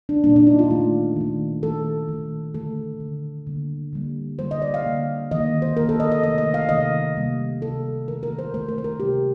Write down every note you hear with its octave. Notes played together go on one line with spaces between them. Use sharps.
D4
A#2 G3 A#3 D4
D4
D#4
F4
D#3 A3 F4
D#3 A3
D#3 A3 A4
D#3 A3
D3 A3 A4
D3 A3
D3 G3 A#3
D3 G3 A#3
D3 G3 A#3 C5
D#5
D5
F5
D3 G3 A#3
D#3 A#3 D#5
C5
D#3 A#3 A#4
A4
D#5
D#5
C3 D#3 A3 D#5
D#5
F5
C3 D#3 A3 D#5
C3 G3 A#3
C3 G3 A#3 A4
D#3 A3 A#4
A#4
C5
D#3 A3 C5
A#4
C5
A#4
C3 G3 A#3 G4